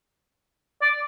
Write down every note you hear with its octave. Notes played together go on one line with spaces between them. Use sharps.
D5